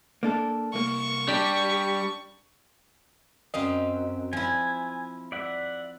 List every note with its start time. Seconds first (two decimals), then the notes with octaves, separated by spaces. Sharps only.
0.23 A#3 D4 A4
0.74 C2 A#3 C#6
1.28 G3 D4 G4
3.54 F#2 C4 D#5 F5
4.33 F3 E4 G#5
5.32 D5 E5 F#5